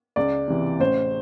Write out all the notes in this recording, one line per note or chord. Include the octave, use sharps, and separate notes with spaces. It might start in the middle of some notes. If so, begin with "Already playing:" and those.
C#2 D5
C3 E3
A1 C5